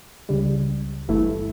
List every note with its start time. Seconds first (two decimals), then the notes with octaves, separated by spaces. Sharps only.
0.29 C#2 C#3 G3
1.08 G1 G2 E3 A3 E4